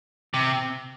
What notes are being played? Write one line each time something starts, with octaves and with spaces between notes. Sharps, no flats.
C3